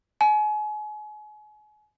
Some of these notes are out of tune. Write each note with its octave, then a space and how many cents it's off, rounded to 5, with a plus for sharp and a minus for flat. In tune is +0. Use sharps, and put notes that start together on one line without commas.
G#5 +35